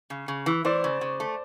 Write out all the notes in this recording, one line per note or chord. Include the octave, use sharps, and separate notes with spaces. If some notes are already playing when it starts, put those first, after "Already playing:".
C#3
C#3
E3
E3 C5 D5
C#3
C#3
A3